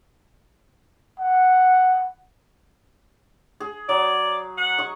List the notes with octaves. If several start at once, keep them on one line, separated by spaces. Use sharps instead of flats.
F#5
G#4
F#3 D5
F#5
D#5 C#6